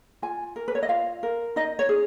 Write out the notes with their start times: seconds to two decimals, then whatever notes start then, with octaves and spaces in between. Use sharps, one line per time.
0.22 F4 G#5
0.56 A#4
0.68 B4
0.75 C#5
0.83 D#5
0.89 F4 F5
1.23 A#4
1.56 D#4 D#5
1.79 C#5
1.89 G#4